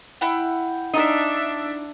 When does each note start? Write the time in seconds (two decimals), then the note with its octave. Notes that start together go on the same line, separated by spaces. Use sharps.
0.21 E4 F#5 G5
0.94 D4 D#4 E5